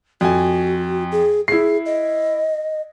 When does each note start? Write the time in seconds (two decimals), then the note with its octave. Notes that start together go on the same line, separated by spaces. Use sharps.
0.21 F2 F#4 G#5
1.12 G#4
1.48 E4 G#4 C7
1.86 D#5